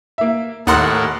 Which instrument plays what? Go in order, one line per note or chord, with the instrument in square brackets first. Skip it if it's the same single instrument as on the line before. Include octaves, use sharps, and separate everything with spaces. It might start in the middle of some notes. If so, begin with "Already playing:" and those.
[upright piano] A#3 E5
[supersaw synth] D#2 F#5 [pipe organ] A2 A4 A#4 [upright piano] C6 D#6